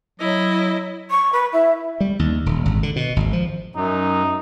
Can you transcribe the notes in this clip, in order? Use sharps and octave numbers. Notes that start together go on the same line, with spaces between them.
F#3 E4 D#5
C#6
B4
E4
G3
D#2
D#1
G#1
D3
B2
G#1
F3
F#2 D#4